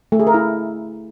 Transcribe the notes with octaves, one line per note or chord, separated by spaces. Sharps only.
A3
G#4
A#4
E4